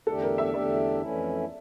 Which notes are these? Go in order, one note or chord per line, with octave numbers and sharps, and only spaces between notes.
E2 D3 A3 D4 G4 A4
A#4
E5
E2 D3 A3 D4 G4 D5
F2 E3 A3 C#4 E4